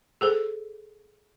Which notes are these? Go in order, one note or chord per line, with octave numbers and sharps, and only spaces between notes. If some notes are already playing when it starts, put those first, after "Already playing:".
G#4 A4 C5